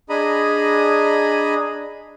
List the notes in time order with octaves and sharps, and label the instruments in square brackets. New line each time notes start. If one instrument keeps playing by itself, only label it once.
[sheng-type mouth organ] D4 G#4 D#5 G#5 A#5 B5